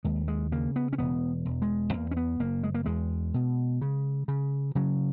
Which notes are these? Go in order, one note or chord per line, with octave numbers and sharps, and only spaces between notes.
D#2 G#3
G#3
C#3 A#3
B3
C#4
E1 B3
E1
G#3
E2 A#3
C#4
B3
F#1 A#3
G#3
A#3
E2 G#3
B2
C#3
C#3
C#3 F#3